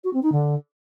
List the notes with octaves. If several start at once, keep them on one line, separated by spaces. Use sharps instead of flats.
F#4
C4
D#4
D3